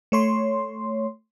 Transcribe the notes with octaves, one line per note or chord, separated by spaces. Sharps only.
A3 C#5 C6